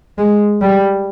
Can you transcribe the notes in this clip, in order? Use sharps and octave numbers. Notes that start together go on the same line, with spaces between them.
G#3
G3